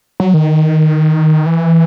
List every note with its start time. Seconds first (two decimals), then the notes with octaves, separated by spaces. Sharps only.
0.20 F#3
0.34 D#3
1.46 E3